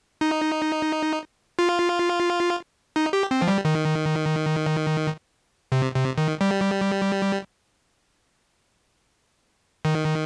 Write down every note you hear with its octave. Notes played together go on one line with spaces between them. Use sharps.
D#4
F4
D#4
G4
C4
F3
G3
D#3
C3
C3
D#3
G3
D#3